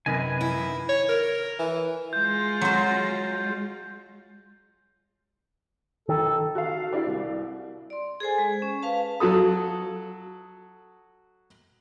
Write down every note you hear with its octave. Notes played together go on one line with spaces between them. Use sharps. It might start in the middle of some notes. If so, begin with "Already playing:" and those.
F#2 C3 D#3 B4 D#5 G#5
E4
C#5
A#4
E3
G#3 F4 G6
F#3 C5
D#3 A4
F#4 A4 F5
E4 G4 D5
C2
D5 C6
G#4 A4 C5 G#5
G#3
C#4
B4 F5 A5
F#3 F#4 A4 D#6